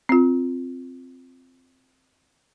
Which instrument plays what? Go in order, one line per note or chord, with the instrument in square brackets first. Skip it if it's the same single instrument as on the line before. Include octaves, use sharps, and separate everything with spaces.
[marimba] C4 F4